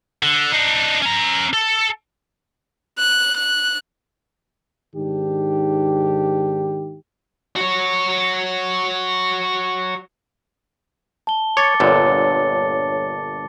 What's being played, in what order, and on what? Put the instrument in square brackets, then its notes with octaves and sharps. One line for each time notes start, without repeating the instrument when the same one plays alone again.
[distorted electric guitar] D3
D4 D#4
C#4 A#5
A4
[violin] F#6
F#6
[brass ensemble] G#2 D#3 D4 G4
[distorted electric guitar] F#4 C#5
[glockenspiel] A5 G7
[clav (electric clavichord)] C#5 [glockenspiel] D6 A6 C#7
[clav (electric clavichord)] G1 A#2 D3 [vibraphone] C#5